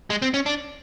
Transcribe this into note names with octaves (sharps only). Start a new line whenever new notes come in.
G#3
C4
C#4
D4